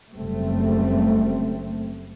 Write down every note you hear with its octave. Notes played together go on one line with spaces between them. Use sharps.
F#1 G3 A3 C4